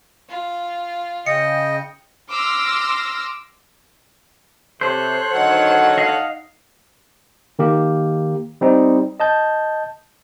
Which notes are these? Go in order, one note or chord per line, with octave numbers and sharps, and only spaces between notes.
F4
C#3 D#5 G5 C#7
C6 D6 E6 F6 A#6
C3 A4 C5 C#5 F#6
D3 D#3 F#3 D#4 F#5
D#5 F5
D#3 A#3 G4
G3 C4 D#4
D#5 A5 G6